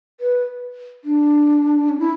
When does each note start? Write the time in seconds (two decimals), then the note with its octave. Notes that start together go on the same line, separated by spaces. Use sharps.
0.20 B4
1.04 D4
1.89 C#4
2.00 E4